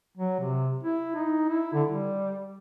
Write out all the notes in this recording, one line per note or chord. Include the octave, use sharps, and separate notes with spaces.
F#3
C3
E4
D#4
E4
D3
G3